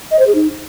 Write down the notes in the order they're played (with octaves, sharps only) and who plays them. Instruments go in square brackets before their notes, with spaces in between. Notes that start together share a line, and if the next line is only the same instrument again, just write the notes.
[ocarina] D#5
C5
G#4
D#4